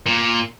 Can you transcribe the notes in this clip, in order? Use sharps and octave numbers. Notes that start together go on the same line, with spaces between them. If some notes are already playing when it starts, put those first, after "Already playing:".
A#2